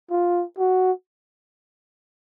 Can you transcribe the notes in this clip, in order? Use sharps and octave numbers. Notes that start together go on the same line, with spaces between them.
F4
F#4